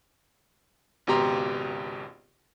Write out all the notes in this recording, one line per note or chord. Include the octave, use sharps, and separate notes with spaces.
G#1 C#2 B2 G4 A#5 C6